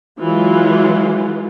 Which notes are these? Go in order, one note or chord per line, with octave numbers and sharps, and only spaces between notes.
E3 F#3 G#3 F4